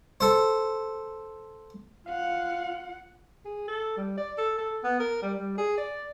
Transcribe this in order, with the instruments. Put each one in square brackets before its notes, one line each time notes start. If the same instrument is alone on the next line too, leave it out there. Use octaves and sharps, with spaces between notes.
[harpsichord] A4 C5
[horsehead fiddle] F4 F#5 [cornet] F5
[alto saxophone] G#4
A4
G3
D5
A4
A4
B3
A#4
G3
G3
G#4
D5